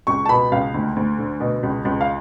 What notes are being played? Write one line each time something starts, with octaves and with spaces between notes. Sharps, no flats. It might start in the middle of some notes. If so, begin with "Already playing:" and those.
C#2 C#6
A5
B2 B5
C#2 F5
D2
D2
D3
B2
C#2
C#2
F5